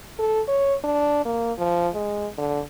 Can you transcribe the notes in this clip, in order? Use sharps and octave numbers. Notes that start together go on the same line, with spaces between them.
A4
C#5
D4
A#3
F3
G#3
D3